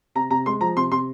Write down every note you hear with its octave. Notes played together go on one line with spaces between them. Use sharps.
C3 A#5
C3 A#5
G#3 C6
F3 A#5
C3 C6
C3 C6